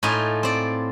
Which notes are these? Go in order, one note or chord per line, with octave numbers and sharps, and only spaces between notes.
A2 D#4 F4 G#5
C4 D5